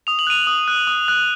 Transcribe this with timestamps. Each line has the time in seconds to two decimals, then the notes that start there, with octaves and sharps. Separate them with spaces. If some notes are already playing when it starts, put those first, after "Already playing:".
0.07 D#6 F7
0.19 F#7
0.27 F#6 D#7 F7
0.47 D#6
0.68 F#6
0.87 D#6
1.08 F#6